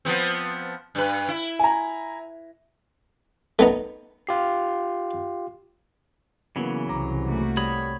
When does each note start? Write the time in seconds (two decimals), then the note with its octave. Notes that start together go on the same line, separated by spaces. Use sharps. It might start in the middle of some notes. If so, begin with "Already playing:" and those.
0.05 F3 B3 C4
0.95 G2 B4
1.29 E4
1.59 G#5 A#5
3.59 A3 B3 D#4
4.27 F4 G4 C7
6.56 C#3 E3 F#3 A#3 B3
6.89 C2 A#5 D6
7.28 A3 A#3 F#4
7.57 G3 C#5 B5 D#6